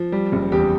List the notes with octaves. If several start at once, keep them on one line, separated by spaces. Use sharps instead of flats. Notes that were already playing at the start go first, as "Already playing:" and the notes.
Already playing: F3
G3
F#1
E2 G4